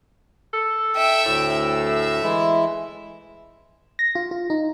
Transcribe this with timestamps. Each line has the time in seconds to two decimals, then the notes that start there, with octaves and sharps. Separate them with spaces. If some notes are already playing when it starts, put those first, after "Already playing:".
0.53 A4
0.96 E5 G5
1.26 D2 A2 E6
1.89 E5
2.23 E3 G#3 E4
3.99 A#6
4.15 F4
4.31 F4
4.50 D#4